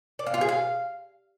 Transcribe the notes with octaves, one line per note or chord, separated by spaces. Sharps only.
D5
F5
F4
G#4
F5